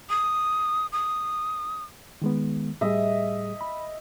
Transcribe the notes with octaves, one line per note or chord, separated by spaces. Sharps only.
D#6
D#6
D#3 G#3 B3
A2 G3 G#4 D#5 E5
B5